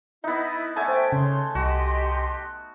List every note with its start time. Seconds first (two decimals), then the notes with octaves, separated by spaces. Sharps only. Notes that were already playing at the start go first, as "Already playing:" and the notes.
0.24 B3 D#4 E4 D#5 E5
0.76 A3 D5 E5 F#5 G#5 A5
0.88 C5 E5 G5
1.12 C#3 C#5 C6
1.55 C2 F#4 G4 D#5 C6